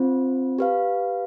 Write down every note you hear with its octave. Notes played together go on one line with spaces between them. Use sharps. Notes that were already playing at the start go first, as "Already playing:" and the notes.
Already playing: C4 F4 C5
G4 B4 F5